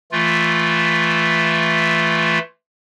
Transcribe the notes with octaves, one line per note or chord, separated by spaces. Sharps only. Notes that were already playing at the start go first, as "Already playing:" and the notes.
E3 A3 F4